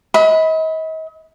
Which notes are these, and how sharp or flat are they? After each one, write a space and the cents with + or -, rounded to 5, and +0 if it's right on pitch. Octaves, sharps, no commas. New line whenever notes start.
D#5 +40 B5 +0